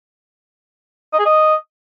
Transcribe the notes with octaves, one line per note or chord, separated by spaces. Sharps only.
D#5
G#4
D#5